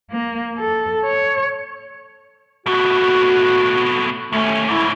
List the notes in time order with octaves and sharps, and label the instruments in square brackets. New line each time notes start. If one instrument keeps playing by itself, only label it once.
[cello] A#3
A4
C#5
[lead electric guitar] B2 A3 [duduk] F#4
[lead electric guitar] D#2 C#4 [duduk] A3
[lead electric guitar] G#2 C#3 [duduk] E4